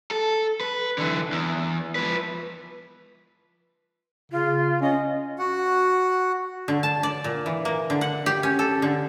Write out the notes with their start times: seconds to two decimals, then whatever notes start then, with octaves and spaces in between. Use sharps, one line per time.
0.11 A4
0.61 B4
0.98 D3 E3
1.32 E2
1.96 F3 B4
4.32 C#3 F4
4.82 C#4 D#5
5.39 F#4 F#5
6.68 D3
6.83 A5
7.03 D5
7.24 A#2
7.46 E3
7.65 A#3
7.90 D3
8.01 F#5
8.26 G4
8.43 C#4
8.59 A4
8.82 D3